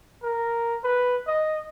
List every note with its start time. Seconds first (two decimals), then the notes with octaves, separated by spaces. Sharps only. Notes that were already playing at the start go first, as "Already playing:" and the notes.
0.23 A#4
0.84 B4
1.27 D#5